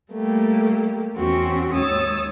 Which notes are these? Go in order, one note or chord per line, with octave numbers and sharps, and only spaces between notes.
G3 A3 A#3 G4
E2 C4 C#4 F#4 G5
D#2 G#2 C#5 D#6 E6 A6